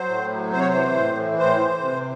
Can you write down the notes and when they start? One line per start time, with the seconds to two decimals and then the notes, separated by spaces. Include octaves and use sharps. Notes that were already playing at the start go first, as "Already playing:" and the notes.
Already playing: F#3 C5
0.09 A2
0.31 F#3
0.52 C3 C5
0.60 C#5
0.68 C5
0.74 E3
0.95 A2
1.17 E3
1.39 A2 C5
1.60 E3
1.80 C3